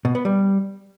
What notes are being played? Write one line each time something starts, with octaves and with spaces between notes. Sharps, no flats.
B2
B3
G3